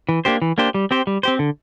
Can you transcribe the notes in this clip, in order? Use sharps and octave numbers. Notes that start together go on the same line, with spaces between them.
E3
A#3 D4 G4 C5
E3
A#3 D4 G4 C5
G3
C4 G4 C5
G3
C4 G4 C5
D3